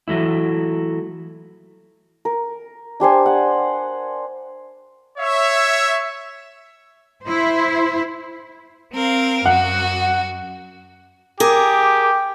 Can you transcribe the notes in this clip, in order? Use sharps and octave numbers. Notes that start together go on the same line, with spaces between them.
E3 F#3 A3 E4
A#4
D4 G4 C5 G#5
F#5
C#5 E5
E4 C5
C4 A#4 F5
F#2 F#4 F#5
G4 G#4 A#4 D6